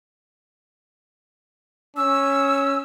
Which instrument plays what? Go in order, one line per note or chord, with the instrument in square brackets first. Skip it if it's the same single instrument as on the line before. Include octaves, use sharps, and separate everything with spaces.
[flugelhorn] C#4 [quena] E6